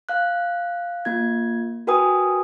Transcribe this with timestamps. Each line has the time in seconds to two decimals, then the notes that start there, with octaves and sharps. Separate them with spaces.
0.09 F5 F#6
1.05 A#3 F4 G#6
1.87 F#4 A#4 B4 G5 G#5 D#6